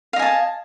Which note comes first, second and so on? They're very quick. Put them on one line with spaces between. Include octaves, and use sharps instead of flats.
F5 D#5 G#5 A5